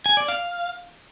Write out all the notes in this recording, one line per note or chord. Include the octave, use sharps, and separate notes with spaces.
G#5
D5
F5